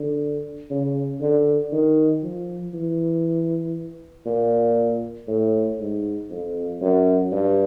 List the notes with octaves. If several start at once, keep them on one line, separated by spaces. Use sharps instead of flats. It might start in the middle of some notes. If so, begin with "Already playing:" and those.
Already playing: D3
C#3
D3
D#3
F3
E3
A#2
A2
G#2
F2
F#2
G2